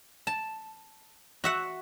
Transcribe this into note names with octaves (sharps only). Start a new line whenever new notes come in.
A5
F#4 E5 F#5